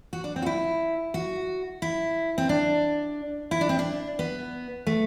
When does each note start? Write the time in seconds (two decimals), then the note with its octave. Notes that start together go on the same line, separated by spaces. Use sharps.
0.13 F#4
0.24 D4
0.36 C4
0.42 F#4
0.46 E4
1.14 F#4
1.82 E4
2.38 C4
2.49 D4
3.51 E4
3.61 D4
3.69 C4
3.79 D4
4.19 B3
4.87 A3